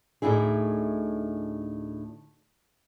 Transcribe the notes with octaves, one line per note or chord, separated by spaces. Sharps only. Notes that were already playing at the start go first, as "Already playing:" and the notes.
D2 A2 C#3 D#4 E4 G#4